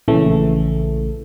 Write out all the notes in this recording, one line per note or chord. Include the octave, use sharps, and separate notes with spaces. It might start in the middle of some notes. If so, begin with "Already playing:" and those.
A#1 C#3 E3 A3